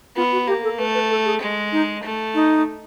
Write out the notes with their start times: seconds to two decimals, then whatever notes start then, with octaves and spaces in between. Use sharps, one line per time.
0.16 B3 F4
0.32 F#4
0.47 A#3 G4
0.63 A4
0.79 A3 B4
0.94 B4
1.10 A4
1.25 G#4
1.41 G#3
1.72 D#4
2.03 A3
2.34 D#4